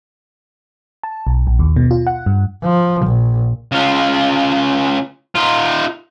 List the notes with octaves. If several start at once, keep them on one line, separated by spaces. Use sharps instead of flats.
A5
B1
A#1
D#2
B2
F4
F#5
G2
F3
A#1
C#3 F4
D#4 F4